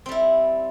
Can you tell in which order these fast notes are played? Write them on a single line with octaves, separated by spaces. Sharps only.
C4 G3 E4